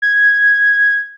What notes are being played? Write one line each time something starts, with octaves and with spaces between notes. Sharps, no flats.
G#6